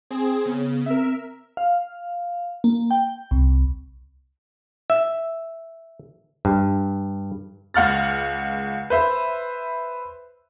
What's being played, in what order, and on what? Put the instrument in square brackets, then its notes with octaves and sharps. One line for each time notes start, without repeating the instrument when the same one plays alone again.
[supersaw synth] C4 G#4
[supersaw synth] C#3 [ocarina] B3
[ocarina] C4 [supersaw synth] A#4 E5
[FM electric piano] F5
A#3
G5
C2
[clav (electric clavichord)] E5
G2
[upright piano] C#2 F#5 F6 A6
B4 C5 E5